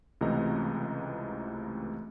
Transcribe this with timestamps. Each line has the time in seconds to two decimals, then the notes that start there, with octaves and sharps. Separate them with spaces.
0.21 C#2 C3 E3 A3 D#5 A#5